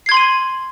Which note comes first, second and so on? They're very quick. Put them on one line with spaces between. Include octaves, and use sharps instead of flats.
C7 G#6 C6 F#7 D#7